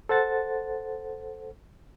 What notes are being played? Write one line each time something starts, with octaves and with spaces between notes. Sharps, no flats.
A4 C5 F#5 A6